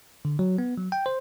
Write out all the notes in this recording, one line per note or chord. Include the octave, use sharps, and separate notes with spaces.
D3
F#3
B3
F#3
G5
C5